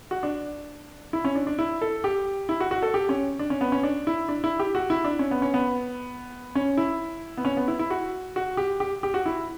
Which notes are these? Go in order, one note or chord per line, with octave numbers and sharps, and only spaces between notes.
F#4
D4
E4
C#4
D4
D4
E4
A4
G4
E4
F#4
F#4
A4
G4
C#4
D4
C#4
B3
C#4
D4
E4
D4
E4
G4
F#4
E4
D4
C#4
B3
C#4
B3
C#4
E4
B3
C#4
B3
E4
E4
F#4
F#4
G4
G4
G4
F#4
E4